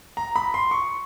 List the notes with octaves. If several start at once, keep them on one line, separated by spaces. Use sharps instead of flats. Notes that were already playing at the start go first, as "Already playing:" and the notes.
A#5
B5
C6
C#6